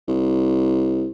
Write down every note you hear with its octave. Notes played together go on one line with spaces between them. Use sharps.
C2